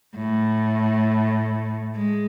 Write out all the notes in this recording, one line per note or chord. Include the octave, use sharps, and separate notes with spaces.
A2
G#3